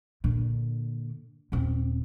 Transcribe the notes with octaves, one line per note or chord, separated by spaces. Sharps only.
A#2 D3
D#1 C4